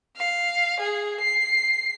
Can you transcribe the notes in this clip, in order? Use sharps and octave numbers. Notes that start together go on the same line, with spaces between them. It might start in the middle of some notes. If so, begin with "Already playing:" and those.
F5
G#4
C7